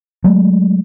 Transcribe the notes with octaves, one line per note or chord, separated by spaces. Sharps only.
F#3 G#3 A3